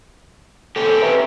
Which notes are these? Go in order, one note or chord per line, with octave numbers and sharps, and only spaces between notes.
C4 C#4 G4 A4
B4 E5 A#5